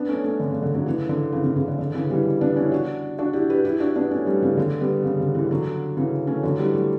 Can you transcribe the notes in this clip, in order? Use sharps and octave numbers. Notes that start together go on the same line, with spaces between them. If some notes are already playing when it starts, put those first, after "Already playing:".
Already playing: B3 D4
A3 C#4
A3 C#4
D3
C#3
D3
D3 F#3
C#3 E3
D3
C#3 E3
C#3 E3
C#3
D3
D3
C#3 E3
E3 G3
B3 D4
C#4 E4
D4 F#4
D4 F#4
E4 G4
G4 B4
E4 G4
D4 F#4
B3 D4
A3 C#4
G3 B3
C#3 E3
D3
G3 B3
C#3
D3
C#3 E3
D3 F#3
C#3 E3
A3 C#4
D3 F#3
E3 G3
F#3 A3